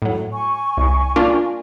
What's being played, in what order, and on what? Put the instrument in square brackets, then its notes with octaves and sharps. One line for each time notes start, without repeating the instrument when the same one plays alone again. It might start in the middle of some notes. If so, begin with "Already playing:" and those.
[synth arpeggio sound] A2 F#3
[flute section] G#5 C#6
[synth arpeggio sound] C2
A#3 D4 F4